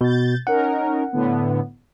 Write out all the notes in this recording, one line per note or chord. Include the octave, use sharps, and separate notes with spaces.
B2 G6 A6
C#4 D#4 A#4 F#5
A2 D3 B3